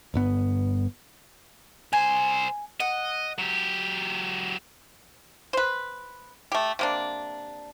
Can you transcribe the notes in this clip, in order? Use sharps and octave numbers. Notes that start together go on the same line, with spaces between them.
G1 G2 B3
C2 C5 G#5
D#5 F#5
F#3 G4
B4 C5
A3 G4
C3 A#3 D4